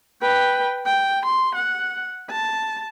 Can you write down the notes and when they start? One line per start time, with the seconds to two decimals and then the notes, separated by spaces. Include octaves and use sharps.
0.22 B4 G5
0.86 G5
1.25 C6
1.55 F#5
2.30 A5